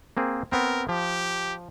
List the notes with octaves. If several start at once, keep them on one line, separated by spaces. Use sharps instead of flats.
A#3 C4 G#4
B3 C4 A#4
F3 G4